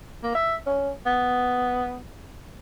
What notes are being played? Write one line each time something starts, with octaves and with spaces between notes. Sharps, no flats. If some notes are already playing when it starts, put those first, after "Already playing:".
A#3
E5
C#4
B3